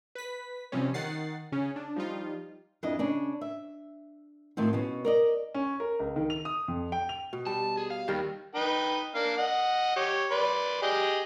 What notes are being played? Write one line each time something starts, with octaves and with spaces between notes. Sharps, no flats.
B4 B6
C3 F3 G3 C4 C#4
D#3 F#5 A6 C7
C#3 C#4
D4
F3 G3 D#4 F4
F2 D4 E4 D#5
C#3 C#4 D4
E5
A2 D#3 F3 C4
B2 C#4
A#4 D5 D#5
C#4
A#4
C#2
D#3
F7
D#6
F2
G5
F7
B2
G3 A5
G#4
F5
D#2 D#3 G3 A#4
D#4 B4 G5
A#3 D4 F5
D#5 F#5
G4 C#5
B4 D5 C6
G4 G#4 D#5